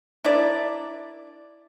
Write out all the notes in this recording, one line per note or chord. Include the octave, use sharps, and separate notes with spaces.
D4 E4 A#4 D5